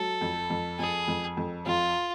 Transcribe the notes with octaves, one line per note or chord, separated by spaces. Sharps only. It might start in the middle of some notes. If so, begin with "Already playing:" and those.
Already playing: F#3 A4
F2
F2
F2 G#4
F2
F2
F2 F4